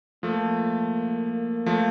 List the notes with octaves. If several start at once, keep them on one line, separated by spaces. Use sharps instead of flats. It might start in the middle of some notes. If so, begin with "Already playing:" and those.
F3 A3 A#3
F3 A3